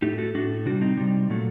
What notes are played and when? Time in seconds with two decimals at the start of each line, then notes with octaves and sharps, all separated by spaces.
0.02 A2 A3 D#4 G4
0.18 F#4 A4
0.35 A2 A3 D4 F#4
0.66 C3 G3 D4 F#4
0.81 C4 D#4
0.97 C3 G3
1.30 A#2 F#3 A3